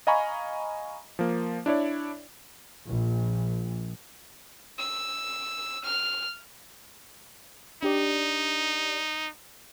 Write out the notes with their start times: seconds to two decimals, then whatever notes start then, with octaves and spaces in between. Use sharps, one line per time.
0.07 D#5 F5 G#5 A#5 B5 C#6
1.19 F3 A#3
1.66 D4 E4 C#5 D5
2.87 A#1
4.79 E6
5.84 F6
7.83 D4 D#4 G4 D5